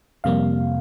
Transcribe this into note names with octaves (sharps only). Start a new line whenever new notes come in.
F2 C3 G3 A#3 F5